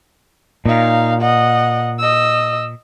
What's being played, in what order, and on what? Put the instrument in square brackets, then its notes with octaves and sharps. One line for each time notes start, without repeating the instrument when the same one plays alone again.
[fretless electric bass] A#2 [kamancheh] D#4 F5
[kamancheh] D#5 F#5
D#5 E6